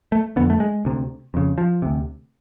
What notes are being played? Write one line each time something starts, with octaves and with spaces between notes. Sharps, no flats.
A3
F2 D3 B3
A3
G#3
D2 C3
F2 C#3
F3
D2 C3